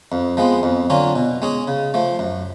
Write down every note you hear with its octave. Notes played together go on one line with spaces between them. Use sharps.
F2
F3 G#3 B3
F2
D3 F#3 C#4 F4
B2
G#3 C#4 G#4
C#3
F3 A3
F#2